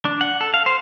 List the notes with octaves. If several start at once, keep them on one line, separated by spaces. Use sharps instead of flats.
D4
F#5
A4
F5
C5